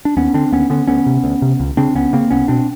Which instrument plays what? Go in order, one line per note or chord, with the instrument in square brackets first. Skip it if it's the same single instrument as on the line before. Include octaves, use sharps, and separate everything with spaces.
[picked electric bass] D4
D#2 B3 C#4
D3 C4 D4
D#2 B3 C#4
D3 B3 C#4
D2 B3 C#4
C3
D2
C3
C#2
C#3 C4 D4
C#2 B3 C#4
C#3 A#3 C4
C2 B3 C#4
B2 C4 D4